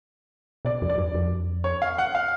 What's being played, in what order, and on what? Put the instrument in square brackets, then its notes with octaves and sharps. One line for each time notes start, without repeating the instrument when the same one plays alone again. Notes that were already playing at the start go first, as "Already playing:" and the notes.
[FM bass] B2 [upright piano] D5
[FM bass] F2
[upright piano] D5
[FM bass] F#2
F2
[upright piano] C#5
F5
F#5
F5